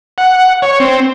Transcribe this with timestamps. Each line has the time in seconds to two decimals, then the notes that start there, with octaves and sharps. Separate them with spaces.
0.18 F#5
0.62 C#5
0.80 C4